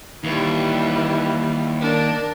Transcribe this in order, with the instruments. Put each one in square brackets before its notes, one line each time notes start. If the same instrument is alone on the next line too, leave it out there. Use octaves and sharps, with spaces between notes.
[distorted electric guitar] D#2 [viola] E3 G3
[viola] D4 A#4